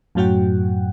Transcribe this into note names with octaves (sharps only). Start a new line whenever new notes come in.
F#2 A2 F#3 F#4 F#5 G5